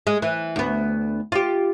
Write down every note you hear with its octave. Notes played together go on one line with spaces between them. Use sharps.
G#3
E3
D2 B3
F4 G4